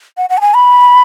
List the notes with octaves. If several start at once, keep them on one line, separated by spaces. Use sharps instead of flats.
F#5
F#5
A5
G#5
B5